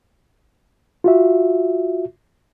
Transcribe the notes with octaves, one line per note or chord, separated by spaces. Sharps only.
F4 F#4 E5